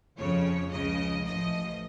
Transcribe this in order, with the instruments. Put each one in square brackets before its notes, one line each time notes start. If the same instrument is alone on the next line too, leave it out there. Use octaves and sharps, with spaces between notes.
[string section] F2 C#3 F3 C#5
C#2 C#3 F3 D#5
A1 A2 F3 D#5